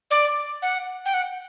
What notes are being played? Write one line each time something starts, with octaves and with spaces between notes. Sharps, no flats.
D5
F#5
G5
F#5